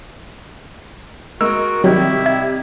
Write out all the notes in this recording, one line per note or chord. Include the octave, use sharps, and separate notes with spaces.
G#3 F#4 A#4 E6
C3 D#3 F#3 G3 E4
E5 G#6